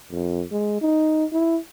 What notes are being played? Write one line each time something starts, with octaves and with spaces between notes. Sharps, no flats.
F2
G#3
D#4
E4